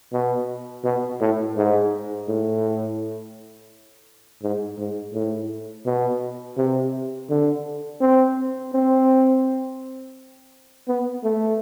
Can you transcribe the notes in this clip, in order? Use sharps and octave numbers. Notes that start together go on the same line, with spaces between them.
B2
B2
A2
G#2
A2
G#2
G#2
A2
B2
C3
D3
C4
C4
B3
A3